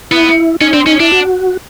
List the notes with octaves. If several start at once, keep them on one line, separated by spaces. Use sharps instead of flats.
B3 E4
C#4 D#4
C4 D4
C#4 D#4
D4 E4
F#4